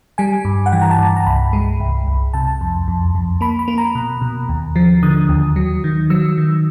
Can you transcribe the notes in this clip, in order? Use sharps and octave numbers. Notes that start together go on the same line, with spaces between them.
G3 G#5
G2
F#5
E3 G5
A#5
A5
G2
A#5
C2 B5
G#3
C2
C2
C3 A5
F2
F2
F2
A#3 B5
B5
A#3
A#5
B2
B2
D#2
F3
D3 D#6
D#2
F#3
D#3
F#3 E6
D#3